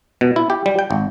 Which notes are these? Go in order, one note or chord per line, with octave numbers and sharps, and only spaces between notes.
B2
E4
G4
G3
G5
G#1